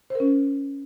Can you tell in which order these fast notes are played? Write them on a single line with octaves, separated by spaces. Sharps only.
C5 A#4 C#4